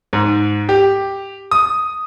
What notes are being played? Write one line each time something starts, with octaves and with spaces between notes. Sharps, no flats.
G#2
G4
D#6